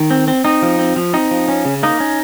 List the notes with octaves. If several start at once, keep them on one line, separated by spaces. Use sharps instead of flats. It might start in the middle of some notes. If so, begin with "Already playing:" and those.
Already playing: D#3
C4
C4
C4 D#4
F3
C4
F3
C4 D#4
F3
C#4
C#3
A#3 D#4
C#4